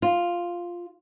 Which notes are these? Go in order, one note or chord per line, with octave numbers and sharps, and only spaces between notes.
F4